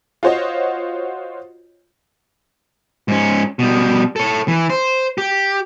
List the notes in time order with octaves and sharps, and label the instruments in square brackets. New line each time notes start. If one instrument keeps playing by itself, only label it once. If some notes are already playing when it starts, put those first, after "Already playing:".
[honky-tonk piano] F4 F#4 C5 C#5 D#5
[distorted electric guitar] G#2 C#4
B2 G3
A4 C#5
E3
C5
G4